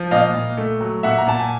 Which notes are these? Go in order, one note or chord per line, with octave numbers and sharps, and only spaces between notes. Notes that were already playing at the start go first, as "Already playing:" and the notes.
Already playing: F3
A#2 D#5 F5
A#2
A3
F#3
A#2 E5 F#5
A#5
A#2 A5
G#5